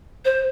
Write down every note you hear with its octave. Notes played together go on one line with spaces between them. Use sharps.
C5